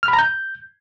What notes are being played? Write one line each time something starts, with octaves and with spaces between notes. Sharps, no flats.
F6
B5
A#5
G6